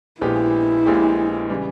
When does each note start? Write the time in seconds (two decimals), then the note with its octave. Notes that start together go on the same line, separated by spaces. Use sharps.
0.21 A#1 A#2 G#3 B3 E4 G4
0.86 A#1 A#2 G#3 B3 G4
1.50 C#3 E3 G3